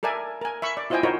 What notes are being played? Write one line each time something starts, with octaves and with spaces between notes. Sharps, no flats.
A4 A#4 D5 E5 G#5
A#4 G#5
E5 B5 C#6
D5
E4 F4 C5 D#5 G5 G#5
D#4 F4 F#4 A#4 C5 C#5